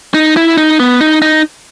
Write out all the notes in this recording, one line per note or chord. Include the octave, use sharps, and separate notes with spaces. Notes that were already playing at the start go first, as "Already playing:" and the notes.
D#4
E4
D#4
B3
D#4
D#4